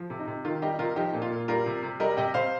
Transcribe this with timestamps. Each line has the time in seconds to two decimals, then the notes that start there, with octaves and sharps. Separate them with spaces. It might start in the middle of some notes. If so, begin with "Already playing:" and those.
Already playing: F3
0.10 C3
0.19 D#4
0.27 C3
0.45 D#3 F4
0.62 G3 D#4 G4
0.79 C3 F4 A#4
0.96 F3 D#4 G4
1.13 A#2
1.22 F4
1.30 A#2
1.48 G3 F4 A#4
1.66 C3
1.83 C3
2.00 G3 A#4 D#5
2.17 C3 D#5 G5
2.34 C3 C5 F5